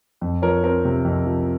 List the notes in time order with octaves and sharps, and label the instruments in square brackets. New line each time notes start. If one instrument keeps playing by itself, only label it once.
[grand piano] F2
F3 A#4 C#5
C4 A#4
C3
F2
F3